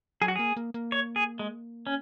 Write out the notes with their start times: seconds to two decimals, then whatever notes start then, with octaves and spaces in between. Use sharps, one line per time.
0.21 F#3 G#4
0.28 F#4
0.36 A#3 G#4
0.57 A#3
0.74 A#3
0.92 C#5
1.16 G#4
1.39 G#3
1.87 C#4